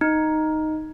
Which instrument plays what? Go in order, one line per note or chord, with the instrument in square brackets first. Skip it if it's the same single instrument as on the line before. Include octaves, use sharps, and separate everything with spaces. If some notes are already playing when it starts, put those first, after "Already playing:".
[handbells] D#4